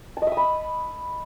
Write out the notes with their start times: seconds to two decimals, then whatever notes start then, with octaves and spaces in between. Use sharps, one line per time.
0.17 A5
0.22 D#5
0.27 E5
0.32 D#6
0.37 B5